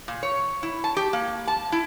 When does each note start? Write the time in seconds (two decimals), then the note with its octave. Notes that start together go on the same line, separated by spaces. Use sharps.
0.08 A#2
0.23 C#5
0.63 E4
0.84 A5
0.97 G4
1.13 A#3
1.47 A5
1.72 E4